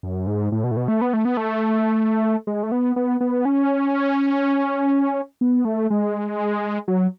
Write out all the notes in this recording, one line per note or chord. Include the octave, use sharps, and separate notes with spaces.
F#2
G#2
A2
B2
A2
B2
A3
B3
A3
B3
A3
G#3
A3
B3
B3
B3
C#4
B3
A3
G#3
F#3